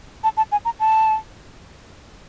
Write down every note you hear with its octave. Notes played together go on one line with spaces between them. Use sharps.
A5
A5
G#5
A#5
A5